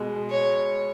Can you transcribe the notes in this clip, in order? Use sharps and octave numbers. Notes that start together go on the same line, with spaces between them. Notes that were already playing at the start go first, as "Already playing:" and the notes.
Already playing: B2 G#3
C#5